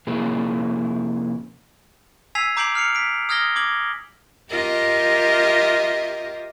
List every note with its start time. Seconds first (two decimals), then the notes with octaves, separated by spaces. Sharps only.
0.07 C3 F3 A#3 C#4 E4 G#4
2.35 G#5 E6 G#6 B6 C7 F7
2.57 A#5 D6 G6 C7 D7 F#7
2.75 F6 C7 C#7 F7
2.95 B6 D7
3.29 D#6 F6 G#6 A#6 G7
3.56 D6 G#6 F#7
4.50 F4 G4 A#4 D#5 E5